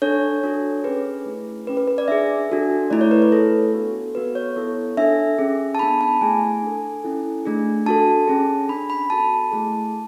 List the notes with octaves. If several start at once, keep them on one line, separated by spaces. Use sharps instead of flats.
D4 A4 C#5
D4 F#4 A4
C#4 G#4 B4
A3 E4 G#4
C#4 G#4 B4
B4
B4
D5
D4 G#4 E5
D4 F#4 A4
A3 E4 A4 D5
C#5
B4
B4
A3 E4 G#4 A4
B3 D4 F#4 A4
B3 F#4 A4 B4
C#5
B3 E4 A4
D4 A4 E5
C#4 G#4
A5
B3 D4 G#4 B5
A5
A3 E4 G#4 G#5
D4 A4
C#4 E4 A4
A3 D4 G#4
D4 F#4 A4 A5
C#4 G#4
D4 G#4 B5
B5
B3 F#4 A4 A5
A3 E4 G#4